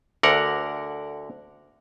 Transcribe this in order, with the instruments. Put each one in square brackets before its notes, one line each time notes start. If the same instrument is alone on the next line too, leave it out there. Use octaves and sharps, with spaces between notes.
[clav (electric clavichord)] D2 D3 A#4 F#5